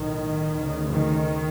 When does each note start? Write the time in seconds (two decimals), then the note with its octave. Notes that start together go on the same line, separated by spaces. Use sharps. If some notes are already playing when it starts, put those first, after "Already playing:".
Already playing: B1 A2 D#3
0.54 D2 C#3
0.88 D#3